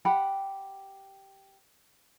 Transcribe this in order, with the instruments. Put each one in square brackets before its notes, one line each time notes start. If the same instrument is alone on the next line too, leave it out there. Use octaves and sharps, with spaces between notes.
[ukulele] G4 F#5 B5